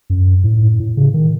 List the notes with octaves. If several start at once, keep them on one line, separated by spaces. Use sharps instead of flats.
F#2
A2
A2
C#3
D#3